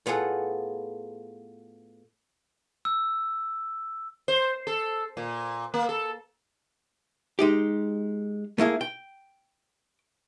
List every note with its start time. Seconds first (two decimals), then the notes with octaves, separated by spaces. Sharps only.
0.06 A2 B3 F4 G#4 A4 F#5
2.85 E6
4.28 C5
4.67 A4
5.17 A#2
5.74 A#3
5.89 A4
7.39 G#3 D#4 G4
8.58 A3 A#3 E4 G#4
8.81 G5